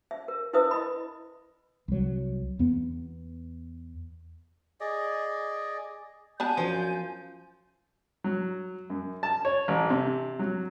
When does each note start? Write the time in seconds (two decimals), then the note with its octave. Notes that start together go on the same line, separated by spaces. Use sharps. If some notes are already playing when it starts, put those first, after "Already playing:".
0.11 E5
0.28 A#4
0.53 E4 A#4 B4 E5 D#6
0.71 D#5 B5
1.88 C2 F#3
2.59 E2 B3
4.81 G#4 D5 D#5
6.40 B3 D4 G#5 A5 G6
6.57 F#2 F3
8.24 F#3
8.90 F#2
9.23 A5
9.45 C#5
9.68 A1
9.90 C3
10.39 F#3